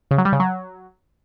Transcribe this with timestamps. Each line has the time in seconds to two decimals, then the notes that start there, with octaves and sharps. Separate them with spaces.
0.11 C#3
0.18 F#3
0.25 G3
0.33 C#3
0.40 F#3